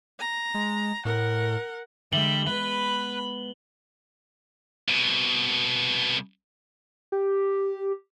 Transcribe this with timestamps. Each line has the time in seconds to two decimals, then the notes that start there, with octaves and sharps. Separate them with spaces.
0.20 A#5
0.54 G#3
1.05 A2 A#4 F#5
2.13 D3 G3 G#3 E5 F#7 G7
2.47 G#3 B3 B4 B5
4.89 C2 B2
7.12 G4